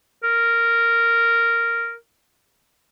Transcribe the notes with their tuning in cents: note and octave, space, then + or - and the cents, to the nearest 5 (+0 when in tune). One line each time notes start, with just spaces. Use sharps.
A#4 -5